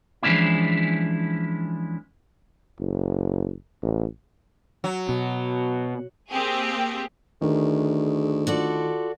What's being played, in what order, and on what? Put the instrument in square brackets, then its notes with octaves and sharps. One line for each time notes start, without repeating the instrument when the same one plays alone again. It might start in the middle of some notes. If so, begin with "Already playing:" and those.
[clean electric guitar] E3 F3 G#3 C#4 D4 E4
[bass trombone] F#1
A1
[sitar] F#3
[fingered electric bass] B2
[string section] A#3 C4 G4 G#4
[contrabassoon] D2 [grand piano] D#3 [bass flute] G#4
[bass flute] F4 [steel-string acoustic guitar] F#4 A4 D5